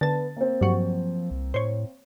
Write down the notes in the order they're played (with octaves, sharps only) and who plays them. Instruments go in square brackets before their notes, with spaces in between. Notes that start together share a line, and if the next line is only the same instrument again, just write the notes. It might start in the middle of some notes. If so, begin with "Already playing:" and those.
[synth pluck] D3 A5 [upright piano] B3 A6
[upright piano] A#3 C4
[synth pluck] G2 F#3 [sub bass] F3
[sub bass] C2
[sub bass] A2 [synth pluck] C5 C#5